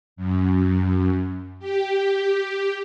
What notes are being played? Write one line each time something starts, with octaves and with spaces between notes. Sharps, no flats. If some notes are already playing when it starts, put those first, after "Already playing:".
F#2
G4